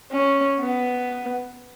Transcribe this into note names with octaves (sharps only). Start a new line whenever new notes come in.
C#4
B3